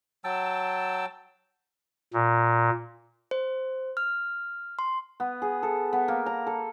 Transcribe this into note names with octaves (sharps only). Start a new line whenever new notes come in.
F#3 G5 A5 E6
A#2
C5
F6
C6
B3
G#4
A4
B3
A#3
A#5
A4